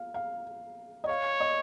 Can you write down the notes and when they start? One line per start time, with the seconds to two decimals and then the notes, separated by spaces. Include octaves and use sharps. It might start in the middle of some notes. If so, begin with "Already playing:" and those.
Already playing: F5
0.14 F5
1.04 D#5
1.09 C#5 F5
1.40 D#5